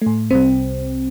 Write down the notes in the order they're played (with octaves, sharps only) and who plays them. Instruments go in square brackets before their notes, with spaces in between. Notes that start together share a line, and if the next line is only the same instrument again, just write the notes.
[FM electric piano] A2 A3
C2 C3 G3 C4